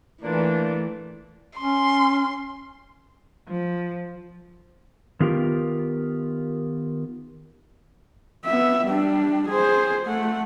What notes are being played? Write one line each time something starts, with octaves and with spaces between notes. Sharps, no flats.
A#2 E3 A3 D4
C#4 C6
F3
D#3 B3 F4 G4 A#4
B3 E5
G3 D4
G#4 C5
A3 F#5